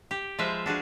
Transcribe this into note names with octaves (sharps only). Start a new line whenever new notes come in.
G4
F3 G#3 B4 C5 E5 F5
D4 F#4 G#4 F5